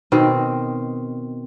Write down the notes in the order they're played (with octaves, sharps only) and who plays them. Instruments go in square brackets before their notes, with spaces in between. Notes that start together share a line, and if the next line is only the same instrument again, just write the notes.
[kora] B2 D#3 C4